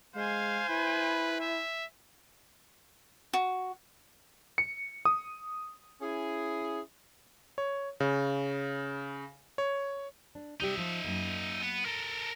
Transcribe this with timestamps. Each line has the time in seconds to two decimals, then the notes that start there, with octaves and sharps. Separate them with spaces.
0.16 G#3 C5 F5 G#5
0.69 E4 B4
1.41 E5
3.33 F#4
4.58 C#7
5.05 D#6
6.01 C#4 E4 G#4
7.58 C#5
8.00 C#3
9.58 C#5
10.35 D4
10.60 C3 G3 D#4 G4 E5
10.78 F3 F4
11.05 F#2 A#3
11.62 B3
11.86 A4 A#4